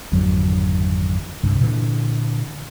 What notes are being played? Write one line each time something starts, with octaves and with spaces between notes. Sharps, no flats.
G#1 F2 D3 F#3
C2 G2 D3
A#2 D3 E3